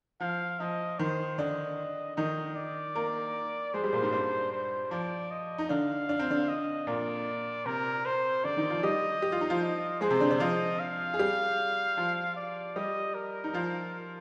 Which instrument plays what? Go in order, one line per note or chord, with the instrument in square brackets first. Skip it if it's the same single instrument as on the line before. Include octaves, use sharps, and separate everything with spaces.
[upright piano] F3 [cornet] F5
[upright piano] F3 [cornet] D#5
[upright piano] D#3 [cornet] C5
[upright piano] D3 D4 [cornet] D#5
[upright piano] D#3 D#4 [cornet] D#5
[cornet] D5
[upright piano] A#3 A#4
[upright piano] G#3 G#4 [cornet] C5
[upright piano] G3 G4
A#2 A#3
G#2 G#3
G2 G3
[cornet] C5
[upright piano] F3 [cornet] D5
[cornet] D#5
[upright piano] D#4
[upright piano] D3 D4 [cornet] F5
[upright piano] D4
C4
D3 D4
[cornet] D#5
[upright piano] A#2 A#3 [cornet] D5
[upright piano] C3 C4 [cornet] A#4
[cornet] C5
[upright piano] D3 D4 [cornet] D5
[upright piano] D#3 D#4
F3 F4
[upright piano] G3 G4 [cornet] D#5
[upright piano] G4
F4
D#4
F3 F4
[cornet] D#5
[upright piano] G#3 G#4 [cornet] C5
[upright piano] C3 C4
D3 D4
D3 D4
[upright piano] F3 F4 [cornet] D#5
[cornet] F5
[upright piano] G#4
G3 G4
F3 F4
[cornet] D5
[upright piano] G3 G4 [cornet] D#5
[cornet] A#4
[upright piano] D#4
F3 F4